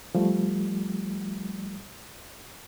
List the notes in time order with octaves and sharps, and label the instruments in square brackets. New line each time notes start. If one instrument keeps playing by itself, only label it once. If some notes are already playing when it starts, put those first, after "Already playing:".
[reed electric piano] F3 G3 A3